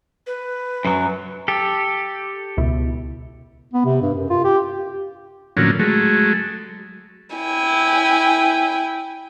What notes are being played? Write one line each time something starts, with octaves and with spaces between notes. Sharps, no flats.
B4
F#2 F#3
G4 A4
C#2 B2 E4
B3
C3
G2
F#2
F4
G4
A2 D3 F3 F#3 A#3 C#4
F#3 G#3 A3
E4 G5 G#5